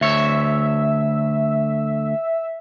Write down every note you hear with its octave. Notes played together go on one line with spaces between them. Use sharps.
D2 C#5 E5